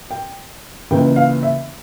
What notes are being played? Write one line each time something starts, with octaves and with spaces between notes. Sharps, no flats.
G5
C#2 C#3 E3 A#3 G5
F5
E5